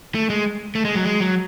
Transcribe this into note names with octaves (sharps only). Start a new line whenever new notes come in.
A3
G#3
A3
G#3
F#3
G#3
F#3